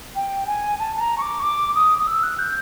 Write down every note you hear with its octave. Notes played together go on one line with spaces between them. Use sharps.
G5
G#5
A5
A5
A#5
C#6
D6
C#6
D6
D#6
D#6
E6
F#6
G6